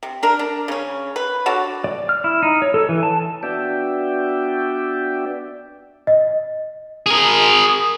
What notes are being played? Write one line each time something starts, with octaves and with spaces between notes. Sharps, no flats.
C3
D4 A#4
D4
C#3 C#4
B4
D3 F#4 C#5 A5
D5
F6
E4
D#4
C#5
A4
E3
A5
B3 D4 F#4 D5 E5 G5
D#5
G#4 A#4